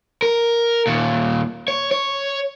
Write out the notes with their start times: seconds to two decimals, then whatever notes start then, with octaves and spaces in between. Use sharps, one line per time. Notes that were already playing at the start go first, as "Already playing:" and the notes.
0.22 A#4
0.87 D#2 A#2
1.68 C#5
1.91 C#5